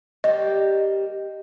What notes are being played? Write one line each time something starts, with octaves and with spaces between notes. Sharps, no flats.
G3 A#3 G4 D#5